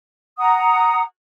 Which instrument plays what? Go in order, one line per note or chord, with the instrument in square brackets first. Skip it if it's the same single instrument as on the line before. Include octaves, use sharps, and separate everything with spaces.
[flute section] F#5 A#5 D#6